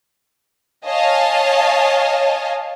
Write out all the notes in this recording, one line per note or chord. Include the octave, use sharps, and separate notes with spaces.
C#5 D#5 F5 G#5 A5